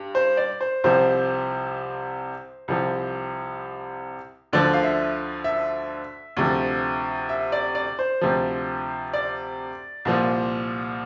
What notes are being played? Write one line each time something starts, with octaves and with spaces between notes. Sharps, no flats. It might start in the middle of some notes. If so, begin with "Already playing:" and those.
Already playing: G2
C5
D5
C5
C2 C3 F3 C5
C2 C3 F3
D2 D3 F3 D5
F5
E5
E5
D2 C3 F3
E5
D5
D5
C5
D2 C3 F3
D5
C2 A#2 F3